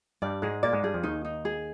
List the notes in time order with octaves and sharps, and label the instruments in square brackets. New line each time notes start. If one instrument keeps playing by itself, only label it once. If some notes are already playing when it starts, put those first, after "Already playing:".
[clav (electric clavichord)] G2 G3 [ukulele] D5
[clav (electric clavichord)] G#2 G#3 [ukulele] G#4
[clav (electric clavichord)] A#2 A#3 [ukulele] D5
[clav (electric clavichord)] G#2 G#3
[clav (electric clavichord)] G2 G3 [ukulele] G#4
[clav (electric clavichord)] F2 F3
[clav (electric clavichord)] D#2 D#3 [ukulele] D#4
[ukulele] D#4
G#4